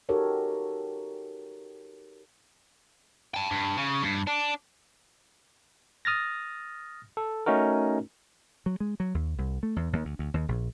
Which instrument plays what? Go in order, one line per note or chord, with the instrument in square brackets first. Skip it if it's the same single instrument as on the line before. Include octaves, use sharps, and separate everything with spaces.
[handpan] D#4 F#4 G4 A4 A#4 C#5
[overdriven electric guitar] G5 A5
G2
C#3
G2
D4
[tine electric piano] D#6 F6 A6 A#6
A4
A3 C#4 D#4 F#4 A#4
[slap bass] F#3
G#3
F#3
D#2
C2
A3
E2
D#2
D2
D2
D#2
A#1